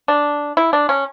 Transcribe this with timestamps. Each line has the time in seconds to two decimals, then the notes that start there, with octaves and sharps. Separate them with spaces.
0.08 D4
0.57 E4
0.73 D4
0.89 C#4